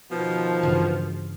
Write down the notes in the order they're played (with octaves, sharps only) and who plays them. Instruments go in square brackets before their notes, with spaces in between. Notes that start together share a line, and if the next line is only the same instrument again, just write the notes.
[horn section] B2 D#3 F3
[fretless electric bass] G2 C#3 E3